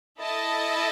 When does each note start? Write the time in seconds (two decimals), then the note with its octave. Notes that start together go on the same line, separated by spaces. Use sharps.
0.19 E4 A4 D#5 A5